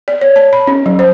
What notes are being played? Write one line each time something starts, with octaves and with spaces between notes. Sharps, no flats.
D5
C#5
A5
B5
C#4
F#3
C5